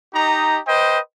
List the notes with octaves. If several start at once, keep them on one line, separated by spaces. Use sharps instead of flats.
D#4 G4 D#5 A#5
B4 C5 D#5 G5